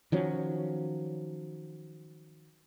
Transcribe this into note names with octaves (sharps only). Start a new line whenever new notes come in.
D#3 F3 F#3 C#4